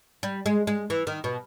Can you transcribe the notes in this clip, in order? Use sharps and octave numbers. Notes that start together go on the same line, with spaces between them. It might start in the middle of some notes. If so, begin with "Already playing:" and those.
G3
G#3
G#3
E3
D#3
B2